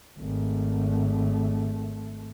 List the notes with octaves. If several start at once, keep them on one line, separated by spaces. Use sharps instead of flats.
G#1 A3